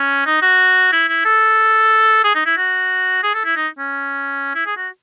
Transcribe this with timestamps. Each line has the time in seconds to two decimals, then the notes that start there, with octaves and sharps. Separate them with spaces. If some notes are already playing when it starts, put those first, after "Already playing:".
Already playing: C#4
0.26 D#4
0.42 F#4
0.92 E4
1.09 E4
1.25 A4
2.24 G#4
2.35 D#4
2.46 E4
2.57 F#4
3.23 G#4
3.34 A4
3.45 E4
3.57 D#4
3.78 C#4
4.55 E4
4.66 G#4
4.77 F#4